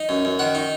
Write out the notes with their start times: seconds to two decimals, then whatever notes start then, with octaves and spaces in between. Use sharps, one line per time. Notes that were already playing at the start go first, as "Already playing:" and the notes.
Already playing: D#4
0.09 F#2
0.25 F#2
0.39 D#3 F#5
0.55 D#4